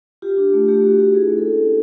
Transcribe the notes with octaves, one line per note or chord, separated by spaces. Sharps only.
F4 G4
D4
A3
A3 G4
F4 F#4
D4 G4
E4 G#4
C#4
A4
A#3
A#3